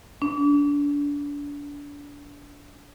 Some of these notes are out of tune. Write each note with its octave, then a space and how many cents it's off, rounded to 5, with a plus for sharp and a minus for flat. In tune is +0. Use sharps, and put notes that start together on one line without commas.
D4 -30